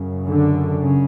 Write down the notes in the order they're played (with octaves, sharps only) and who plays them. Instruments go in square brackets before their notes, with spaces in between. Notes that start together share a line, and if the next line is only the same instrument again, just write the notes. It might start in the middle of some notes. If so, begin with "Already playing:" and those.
Already playing: [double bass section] F#2 C#3
D3
C#3